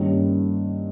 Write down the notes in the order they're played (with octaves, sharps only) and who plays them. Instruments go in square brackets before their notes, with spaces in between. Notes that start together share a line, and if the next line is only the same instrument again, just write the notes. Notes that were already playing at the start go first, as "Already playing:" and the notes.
Already playing: [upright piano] G2 D#3 G3 A#3 C#4